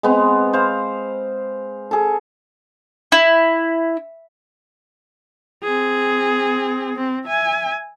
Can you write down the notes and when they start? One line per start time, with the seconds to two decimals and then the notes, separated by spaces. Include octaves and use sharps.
0.03 G#3 B3 C4
0.53 C5 F5
1.91 G#4 A4
3.12 E4
5.63 C4 G#4
6.95 C4
7.26 E5 G#5